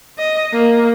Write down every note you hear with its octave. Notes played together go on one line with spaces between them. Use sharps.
D#5
A#3